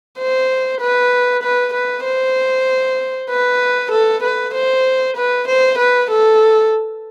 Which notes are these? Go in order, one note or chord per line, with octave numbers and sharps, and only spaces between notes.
C5
B4
B4
B4
C5
B4
A4
B4
C5
B4
C5
B4
A4